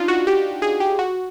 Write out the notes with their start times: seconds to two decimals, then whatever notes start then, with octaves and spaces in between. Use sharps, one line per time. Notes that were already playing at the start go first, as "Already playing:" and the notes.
Already playing: D4 D#4 F4
0.08 F#4
0.27 G4
0.62 G#4
0.80 G4
0.99 F#4